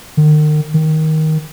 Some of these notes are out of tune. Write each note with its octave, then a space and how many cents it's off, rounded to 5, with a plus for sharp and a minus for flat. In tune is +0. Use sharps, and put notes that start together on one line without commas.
D#3 -40
D#3 +10